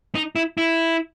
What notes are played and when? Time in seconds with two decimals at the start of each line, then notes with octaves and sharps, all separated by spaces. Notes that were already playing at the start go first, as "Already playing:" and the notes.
0.15 D#4
0.35 E4
0.58 E4